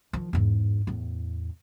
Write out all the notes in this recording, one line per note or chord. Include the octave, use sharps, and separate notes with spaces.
D#3 F3
E2 G#2
E2 A2